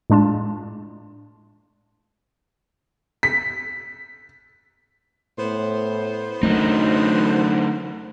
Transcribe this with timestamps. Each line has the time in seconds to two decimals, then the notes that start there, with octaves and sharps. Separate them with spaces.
0.10 A2 G#3 D4 F4 A5
3.23 B6
5.38 A2 B3 C5
6.43 F#2 D3 F#3 A3 D#4